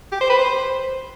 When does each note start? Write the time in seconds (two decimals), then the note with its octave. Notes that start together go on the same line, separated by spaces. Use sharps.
0.12 G4
0.21 C5
0.30 B4
0.38 C5